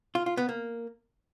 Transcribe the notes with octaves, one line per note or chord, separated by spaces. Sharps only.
F4
F4
B3
A#3